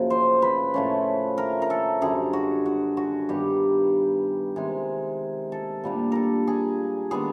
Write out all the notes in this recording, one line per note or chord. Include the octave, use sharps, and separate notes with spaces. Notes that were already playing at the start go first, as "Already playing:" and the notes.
Already playing: F#2 C#3 F3 A#3
C5
B4
A2 F3 A3 C#4
A#4
A#4
A4
F#2 D3 G3 G#4
F#4
F#4
F#4
G2 D#3 G3 B3 G4
C3 D#3 G#3 G#4
A4
A#2 G3 A#3 D4
A4 A#4
G#4
D#3 G#3 B3 D4 G#4